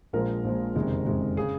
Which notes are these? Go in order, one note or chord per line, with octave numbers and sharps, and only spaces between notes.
A#1 A#2 F3 G#3 A#4
A#1 A#2 F3 G#3
F#1 F2 C3 D#3 G#3
F#1 F2 C3 D#3 G#3
C#3 G#4